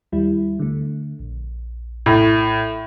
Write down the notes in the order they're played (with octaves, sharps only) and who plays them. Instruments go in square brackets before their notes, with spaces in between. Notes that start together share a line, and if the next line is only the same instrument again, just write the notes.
[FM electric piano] D#2 G3 E4
D3 A3
A#1
[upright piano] A2